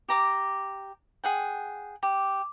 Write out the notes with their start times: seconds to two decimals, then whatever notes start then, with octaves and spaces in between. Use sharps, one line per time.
0.08 G4 A#5 D6
1.24 G#4 F#5 G5
2.03 G4